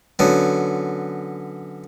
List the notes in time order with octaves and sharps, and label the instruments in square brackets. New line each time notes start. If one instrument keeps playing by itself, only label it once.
[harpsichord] F#2 D3 B3